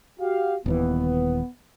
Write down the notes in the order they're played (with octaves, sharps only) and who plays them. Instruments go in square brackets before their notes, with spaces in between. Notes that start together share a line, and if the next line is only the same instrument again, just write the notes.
[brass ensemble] F#4 G4 F5
[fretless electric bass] D#1 D#2 E3 [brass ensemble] B3